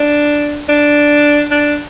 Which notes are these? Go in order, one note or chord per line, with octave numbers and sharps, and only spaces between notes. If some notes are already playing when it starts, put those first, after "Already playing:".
Already playing: D4
D4
D4